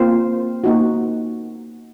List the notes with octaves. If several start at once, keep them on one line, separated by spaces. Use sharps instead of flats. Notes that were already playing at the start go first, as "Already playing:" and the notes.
Already playing: A#3 C4 F4 C5
A#3 D#4 F#4